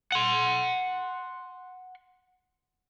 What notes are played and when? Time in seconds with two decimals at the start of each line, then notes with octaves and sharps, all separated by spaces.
0.12 F#5 C6